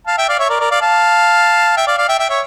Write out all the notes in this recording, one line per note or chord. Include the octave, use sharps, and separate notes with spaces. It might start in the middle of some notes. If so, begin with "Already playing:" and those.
F5 A5
E5 G5
D5 F5
C#5 E5
A#4 D5
A#4 D5
D5 F5
F5 A5
E5 G5
D5 F5
D5 F5
E5 G5
E5 G5
C#5 E5